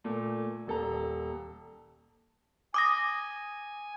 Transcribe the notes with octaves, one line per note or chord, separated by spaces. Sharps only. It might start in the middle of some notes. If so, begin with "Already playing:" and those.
A#2 A3
D#1 A4 A#5
G#5 D6 D#6 A#6